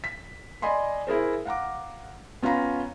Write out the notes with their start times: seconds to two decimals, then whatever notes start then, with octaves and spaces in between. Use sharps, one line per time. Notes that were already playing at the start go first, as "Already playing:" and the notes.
0.04 B6
0.62 D5 D#5 G#5 B5 C6
1.07 E4 G#4 A#4 C5
1.45 F5 F#5 A#5 D6
2.43 B3 C#4 F4 F5 A#5 B5